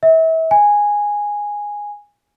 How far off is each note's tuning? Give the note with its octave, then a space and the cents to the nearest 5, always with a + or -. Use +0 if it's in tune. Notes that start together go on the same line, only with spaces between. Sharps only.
E5 -35
G#5 -10